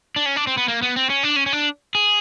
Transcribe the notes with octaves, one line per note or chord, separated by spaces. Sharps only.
D4
C#4
D4
C4
B3
A#3
B3
C4
C#4
D4
C#4
C#4
D4
G#4